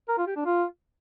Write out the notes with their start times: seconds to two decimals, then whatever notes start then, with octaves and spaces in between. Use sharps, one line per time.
0.08 A#4
0.18 F4
0.27 G4
0.36 D4
0.45 F4